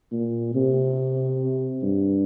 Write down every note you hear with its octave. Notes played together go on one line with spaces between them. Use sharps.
A#2
C3
G2